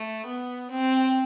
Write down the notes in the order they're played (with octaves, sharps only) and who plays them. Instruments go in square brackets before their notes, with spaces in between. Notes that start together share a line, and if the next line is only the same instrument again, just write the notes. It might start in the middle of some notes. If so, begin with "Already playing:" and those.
Already playing: [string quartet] A3
B3
C4